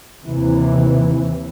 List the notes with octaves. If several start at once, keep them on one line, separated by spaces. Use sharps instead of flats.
D#2 C3 E3